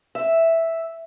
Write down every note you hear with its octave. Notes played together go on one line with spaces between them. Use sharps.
E5